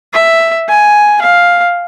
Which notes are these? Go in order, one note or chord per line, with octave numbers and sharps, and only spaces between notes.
E5
G#5
F5